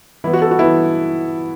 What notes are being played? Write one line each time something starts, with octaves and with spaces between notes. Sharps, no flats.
E3 B3 E4
F#4
A4
F#4
E3 B3 E4